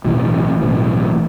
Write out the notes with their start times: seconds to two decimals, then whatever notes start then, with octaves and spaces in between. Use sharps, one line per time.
0.05 B1 A2 E3
0.61 B1 A2 E3